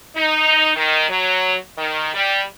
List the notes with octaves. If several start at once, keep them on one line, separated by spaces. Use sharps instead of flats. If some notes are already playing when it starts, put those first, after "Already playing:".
D#4
D#3
F#3
D#3
G3